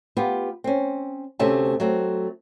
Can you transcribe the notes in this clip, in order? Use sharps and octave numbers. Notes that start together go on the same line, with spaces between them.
B3 F4 G4
C4 C#4
D2 C3 A3 C4 C#4 A5
F#3 A3 C4